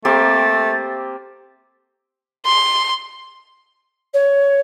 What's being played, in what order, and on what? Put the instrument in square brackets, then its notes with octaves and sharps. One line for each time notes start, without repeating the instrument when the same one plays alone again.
[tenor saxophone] A3 [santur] A#3 C4 G4 [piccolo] A6
[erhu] C6
[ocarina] C#5